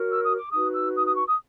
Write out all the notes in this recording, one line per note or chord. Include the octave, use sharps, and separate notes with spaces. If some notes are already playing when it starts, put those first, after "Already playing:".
Already playing: F#4 A#4 C#5
E6
D#6
D6
D#4 F#4 B4 D#6
E6
D#6
D#6
C#6
D#6